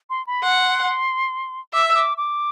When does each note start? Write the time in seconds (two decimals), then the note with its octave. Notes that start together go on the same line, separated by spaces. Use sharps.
0.10 C6
0.27 B5
0.43 F#5 C6
1.73 E5 D6
1.85 E6
1.96 D6
2.18 D6